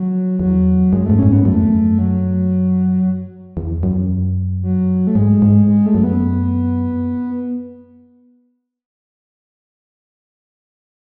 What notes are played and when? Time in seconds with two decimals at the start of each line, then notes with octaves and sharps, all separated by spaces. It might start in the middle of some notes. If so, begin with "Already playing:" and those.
Already playing: F#3
0.40 E2 F#3
0.93 F#2 G#3
1.06 G#2 A3
1.19 A2 C#4
1.28 G#2
1.33 B3
1.45 F#2 A3
1.54 E2
1.61 F#2
1.98 F#3
3.57 E2
3.83 F#2
4.63 F#3
5.07 A3
5.15 G#2 G#3
5.42 G#2
5.68 G#3
5.86 A3
5.95 F#2
6.04 B3